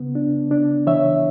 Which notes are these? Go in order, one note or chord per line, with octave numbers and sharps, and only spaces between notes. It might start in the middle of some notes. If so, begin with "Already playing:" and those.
Already playing: C#3 B3
D4
D4
E3 C#5 E5